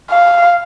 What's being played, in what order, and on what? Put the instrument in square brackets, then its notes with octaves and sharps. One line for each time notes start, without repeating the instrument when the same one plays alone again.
[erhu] F5